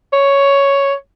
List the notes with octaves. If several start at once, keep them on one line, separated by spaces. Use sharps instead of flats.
C#5